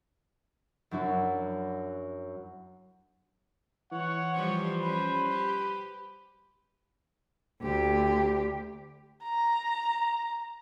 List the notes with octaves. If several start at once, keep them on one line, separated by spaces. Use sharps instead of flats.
F#2 F#3 D4 E4 F#4
E3 C#5 F#5
F3 G3 C5
G3 C#4 B4
G4
D2 G4
A#5